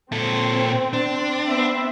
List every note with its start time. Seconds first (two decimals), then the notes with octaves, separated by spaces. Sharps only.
0.12 A#2 C4 A4
0.93 D4
1.48 B3 C4 E5